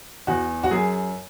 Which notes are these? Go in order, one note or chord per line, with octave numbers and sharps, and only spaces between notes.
E2 F#4
F#4
F#2 G#4